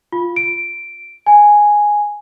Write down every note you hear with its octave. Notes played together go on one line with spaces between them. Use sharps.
F4
D7
G#5